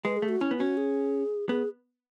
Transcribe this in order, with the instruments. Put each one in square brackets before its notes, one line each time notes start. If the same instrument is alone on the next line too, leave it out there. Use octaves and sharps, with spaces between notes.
[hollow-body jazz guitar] G#3 [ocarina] B4
[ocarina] G#4
[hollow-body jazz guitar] A3
[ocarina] F#4
[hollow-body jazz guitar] C#4 [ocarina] E4
[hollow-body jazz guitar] B3
[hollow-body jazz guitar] C#4 [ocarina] F#4
[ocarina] G#4
[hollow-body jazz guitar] B3 [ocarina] G#4